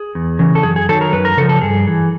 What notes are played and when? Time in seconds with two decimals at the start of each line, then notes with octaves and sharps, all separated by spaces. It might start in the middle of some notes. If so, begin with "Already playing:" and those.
Already playing: G#4
0.15 E2
0.39 C#3 E3
0.55 A4
0.63 F#2 G#4
0.76 G#4
0.89 D#3 F#3 A4
1.01 A#4
1.12 F#2 B4
1.25 A#4
1.37 C#3 A4
1.41 F3
1.49 A4
1.61 G2 G#4
1.87 E3